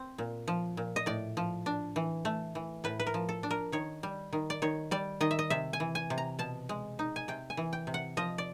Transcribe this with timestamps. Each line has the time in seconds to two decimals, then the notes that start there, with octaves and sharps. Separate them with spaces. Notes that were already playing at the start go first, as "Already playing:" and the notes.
Already playing: C4
0.18 A#2
0.48 F3
0.77 A#2
0.96 D#5
1.06 A2 D5
1.37 F3
1.66 D4
1.96 E3
2.25 A3
2.55 E3
2.84 A2 B4
3.00 B4
3.07 A#4
3.14 F3
3.29 A4
3.43 D4
3.51 A#4
3.72 D#3 C#5
4.03 G3
4.33 D#3
4.50 D5
4.62 D#3 C#5
4.91 G3 D5
5.21 D#3 D#5
5.31 E5
5.39 D#5
5.50 C3 E5
5.73 G#5
5.80 E3
5.95 G#5
6.10 C3
6.18 A#5
6.39 B2 A5
6.69 G#3
6.99 D#4
7.16 G#5
7.28 C3 G5
7.50 G#5
7.57 E3
7.73 G5
7.87 C3
7.94 F#5
8.17 F3 D#5
8.38 D5